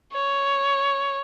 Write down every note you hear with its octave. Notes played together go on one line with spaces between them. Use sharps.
C#5